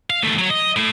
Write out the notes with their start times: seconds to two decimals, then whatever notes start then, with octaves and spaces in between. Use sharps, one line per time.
0.10 F5
0.23 D#2 A3
0.38 F#3 C#5
0.50 D#5
0.76 A2 A3